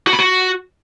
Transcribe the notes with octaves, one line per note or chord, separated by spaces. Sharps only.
F#4
B5
F#4